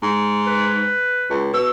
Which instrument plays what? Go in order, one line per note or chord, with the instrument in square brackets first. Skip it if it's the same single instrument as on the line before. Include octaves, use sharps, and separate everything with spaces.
[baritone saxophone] G#2
[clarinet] B4
[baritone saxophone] C#2
[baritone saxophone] B2 [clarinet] E6